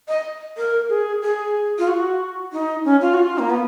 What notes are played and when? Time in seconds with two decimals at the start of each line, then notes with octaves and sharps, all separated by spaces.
0.08 D#5
0.57 A#4
0.89 G#4
1.22 G#4
1.78 F4
1.88 F#4
2.53 D#4
2.85 C#4
3.01 F4
3.14 F#4
3.17 F4
3.39 A#3
3.50 B3